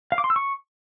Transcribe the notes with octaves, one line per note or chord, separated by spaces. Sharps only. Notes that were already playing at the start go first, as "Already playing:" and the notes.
F5
D6
C6
E6
C#6